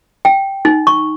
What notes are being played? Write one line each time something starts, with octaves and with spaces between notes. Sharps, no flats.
G5
D#4
C#6